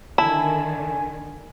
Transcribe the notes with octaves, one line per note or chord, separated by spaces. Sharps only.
D3 D#3 E4 G#5 A5